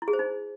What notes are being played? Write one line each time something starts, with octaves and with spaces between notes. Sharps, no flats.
E4
G#4
C5
D#4